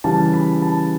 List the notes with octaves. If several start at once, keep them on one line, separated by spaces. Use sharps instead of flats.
C#3 E3 G3 A5
B5
A5